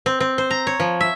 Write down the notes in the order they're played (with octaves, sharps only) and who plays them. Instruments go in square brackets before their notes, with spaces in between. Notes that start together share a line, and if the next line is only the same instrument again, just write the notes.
[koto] C4
C4
C5
A#5
C#5
F3
E5